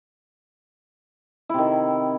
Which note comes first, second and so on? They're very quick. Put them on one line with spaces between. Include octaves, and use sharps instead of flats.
E4 C3 D#3